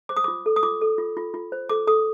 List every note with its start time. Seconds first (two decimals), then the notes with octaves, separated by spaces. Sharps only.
0.09 C5 D6
0.17 D#6
0.24 F4 D6
0.46 A4
0.56 D#6
0.63 F4 D6
0.81 A4
0.98 F4
1.17 F4
1.34 F4
1.52 C5
1.69 A4 D6
1.87 A4 D#6